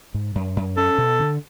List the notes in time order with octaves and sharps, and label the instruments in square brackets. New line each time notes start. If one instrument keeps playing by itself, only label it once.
[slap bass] G#2
F#2
F#2
[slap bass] C#4 [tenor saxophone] A4
[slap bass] B2
D3